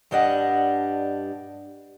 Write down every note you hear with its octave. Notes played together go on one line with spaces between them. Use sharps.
G2 G3 D4 D#5 F#5